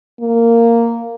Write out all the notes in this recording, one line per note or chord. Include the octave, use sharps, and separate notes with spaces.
A#3